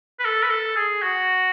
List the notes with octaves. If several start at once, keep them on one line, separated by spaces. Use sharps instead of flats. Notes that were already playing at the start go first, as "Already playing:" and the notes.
B4
A4
B4
A4
G#4
F#4